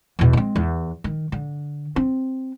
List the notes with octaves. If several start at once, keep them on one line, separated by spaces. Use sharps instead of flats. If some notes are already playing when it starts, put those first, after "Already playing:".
E2 B2
G#3 C4
E2
D#3
D3
C4